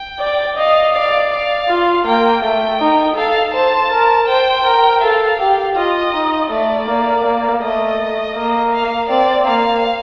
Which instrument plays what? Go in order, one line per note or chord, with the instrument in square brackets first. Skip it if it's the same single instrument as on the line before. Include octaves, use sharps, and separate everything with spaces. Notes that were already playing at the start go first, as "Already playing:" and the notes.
Already playing: [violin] G5
[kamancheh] D5
[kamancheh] D#5 [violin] F5
[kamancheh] D5 [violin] F5
[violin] F5
[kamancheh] F4
[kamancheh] A#3 [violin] G5
[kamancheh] A3 [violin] G5
[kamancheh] D#4
[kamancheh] A4 [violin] F5
[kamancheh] C5 [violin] A5
[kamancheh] A#4
[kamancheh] C5 [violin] G5
[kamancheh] A#4
[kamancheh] A4 [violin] F5
[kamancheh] G4
[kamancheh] F4 [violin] D#5
[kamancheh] D#4
[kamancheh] A3 [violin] D5
[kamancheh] A#3
A#3
[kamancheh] A3 [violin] D#5
[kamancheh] A#3
[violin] F5
[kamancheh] C4 [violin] D5
[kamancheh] A#3 [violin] F5